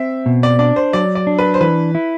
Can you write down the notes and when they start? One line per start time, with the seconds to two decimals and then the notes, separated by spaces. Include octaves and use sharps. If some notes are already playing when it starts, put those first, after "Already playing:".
Already playing: C4 E5
0.26 B2
0.43 D5
0.59 D4 D5
0.76 C5
0.93 F#3 D5
1.15 D5
1.27 D4
1.38 B4
1.54 C5
1.60 E3 B4
1.95 E4